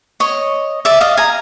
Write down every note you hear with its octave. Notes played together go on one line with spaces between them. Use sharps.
C#5 D#5
D5 E5
D#5 F5
G#5 A#5